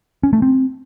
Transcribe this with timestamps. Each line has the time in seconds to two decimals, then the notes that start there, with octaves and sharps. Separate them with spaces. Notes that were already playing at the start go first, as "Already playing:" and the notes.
0.23 C#4
0.33 A3
0.42 C4